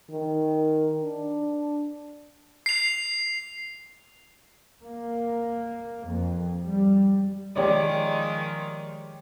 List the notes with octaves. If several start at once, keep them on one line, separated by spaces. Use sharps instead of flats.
D#3
D4
C7 F7
A#3
F2
G3
D#3 F3 G#3 G4 C#5 D5